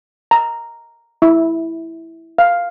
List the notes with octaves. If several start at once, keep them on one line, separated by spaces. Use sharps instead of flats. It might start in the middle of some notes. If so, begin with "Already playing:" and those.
A#5
E4
F5